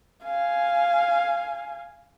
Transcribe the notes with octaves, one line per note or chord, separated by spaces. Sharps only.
F5 G#5